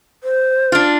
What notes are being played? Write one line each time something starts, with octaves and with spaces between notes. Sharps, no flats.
C5
D4 F4